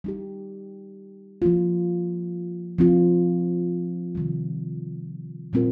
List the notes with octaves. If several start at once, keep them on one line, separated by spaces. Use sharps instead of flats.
G3 D#4 G4
F3 A#3 F4
F3 C4 F4
C3 D#3 G3
A#2 G3 C4 F4 A#4